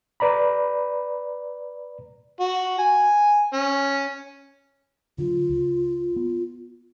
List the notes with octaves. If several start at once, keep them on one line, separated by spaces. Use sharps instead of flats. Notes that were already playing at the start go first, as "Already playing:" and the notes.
B4 D5 A#5 B5
F#4
G#5
C#4
D3 F#3 F4
C#2
B3